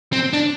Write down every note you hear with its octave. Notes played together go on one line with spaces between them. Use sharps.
C4
D4